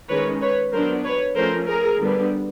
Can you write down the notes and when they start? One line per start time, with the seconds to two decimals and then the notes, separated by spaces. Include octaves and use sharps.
0.08 D#3 G#3 C#4 B4 C#5
0.41 B4 C#5
0.72 F#3 B3 D4 A#4 C5
1.04 B4 C#5
1.36 F3 A3 C#4 A#4 C5
1.67 G#4 A#4
2.00 D3 G3 B3 D4